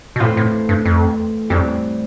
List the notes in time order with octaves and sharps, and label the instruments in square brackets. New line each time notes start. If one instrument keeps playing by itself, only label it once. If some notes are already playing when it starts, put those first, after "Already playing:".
[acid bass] B2
[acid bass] A2 [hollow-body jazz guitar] E3 A3 C4 F4
[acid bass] A2
G2
F2
[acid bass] F2 [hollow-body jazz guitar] A2 E3 G3 C4 G4